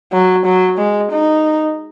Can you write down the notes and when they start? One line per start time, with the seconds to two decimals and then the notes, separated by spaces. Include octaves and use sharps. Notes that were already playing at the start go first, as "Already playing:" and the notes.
0.12 F#3
0.45 F#3
0.77 G#3
1.11 D#4